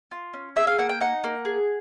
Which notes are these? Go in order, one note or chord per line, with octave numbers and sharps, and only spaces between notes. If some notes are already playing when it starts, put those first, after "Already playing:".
F4
C#4
G#4 E5
F5
A#3 F#5
G5
D#4 F#5
A#3
G#4